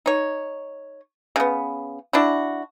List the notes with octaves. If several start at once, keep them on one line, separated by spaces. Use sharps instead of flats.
D#4 C#5
C#3 B3
D4 E4 F#4